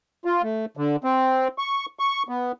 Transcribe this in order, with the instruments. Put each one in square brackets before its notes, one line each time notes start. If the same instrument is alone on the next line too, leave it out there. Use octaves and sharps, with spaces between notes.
[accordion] F4
A3
D3
C4
C#6
C#6
B3